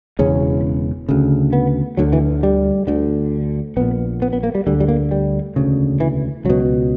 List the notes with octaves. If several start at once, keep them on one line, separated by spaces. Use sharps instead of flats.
E1 E2 C#3 C#4
D2 C#3
B3
D2 D3 F#3
E3
G3
D2 D3
A#1 A#2 B3
B3
B3
A#3
G3
D2 D3 G3
G3
A#3
G3
E1 D2 C#3
E3
C#2 B2 F#3